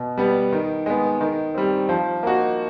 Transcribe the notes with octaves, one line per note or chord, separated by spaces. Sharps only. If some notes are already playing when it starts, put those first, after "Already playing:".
Already playing: B2
G3 B3
D#3
G#3 B3
D#3
G3 C4
F3
A#3 D#4 F#4